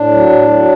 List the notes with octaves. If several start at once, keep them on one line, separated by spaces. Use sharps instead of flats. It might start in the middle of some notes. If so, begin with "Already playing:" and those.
Already playing: A2 D4
F#3
A2
F#3